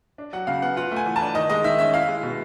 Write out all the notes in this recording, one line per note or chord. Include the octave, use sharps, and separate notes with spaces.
D4
F#3 F#5
C#3 F5
B3 F#5
F4 F#5
A3
G#5
E3
A5
D4
D#3 D#5
G#3 D#5
D#3 E5
C#4 E5
E4 F5
G#3
B2